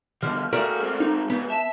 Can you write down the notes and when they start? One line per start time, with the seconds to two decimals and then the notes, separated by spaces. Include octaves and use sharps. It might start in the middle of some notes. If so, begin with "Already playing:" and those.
0.23 B2 D3 G3 F6
0.53 A3 F#4 G#4 A#4 D5
0.80 G#3 C4
1.00 D#4
1.30 G#2 C#3 B3
1.50 E5 A5